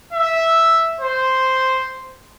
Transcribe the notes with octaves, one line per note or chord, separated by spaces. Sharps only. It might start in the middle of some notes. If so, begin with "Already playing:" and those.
E5
C5